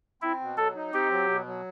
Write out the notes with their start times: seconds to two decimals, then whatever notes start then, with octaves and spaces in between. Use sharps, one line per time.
0.22 C4 E4
0.40 B2
0.57 F#3 A4
0.75 D#4
0.93 C4 G4
1.11 F#3
1.28 B2
1.46 F#3